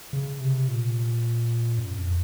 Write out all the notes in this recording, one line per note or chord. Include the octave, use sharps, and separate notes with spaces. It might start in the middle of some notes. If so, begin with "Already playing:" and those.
C#3
C3
A#2
F#2
F2